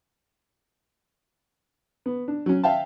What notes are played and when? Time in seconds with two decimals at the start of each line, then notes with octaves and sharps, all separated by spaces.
2.06 B3
2.28 D4
2.46 F#3 C#4
2.64 E5 F5 G5 A5